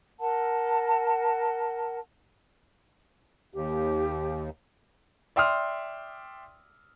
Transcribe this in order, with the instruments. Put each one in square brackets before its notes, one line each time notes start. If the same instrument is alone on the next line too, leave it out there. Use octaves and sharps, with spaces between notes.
[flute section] A#4 F#5 A5
[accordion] D#2 [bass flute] G4
[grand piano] D5 E5 G5 C6 D#6 F6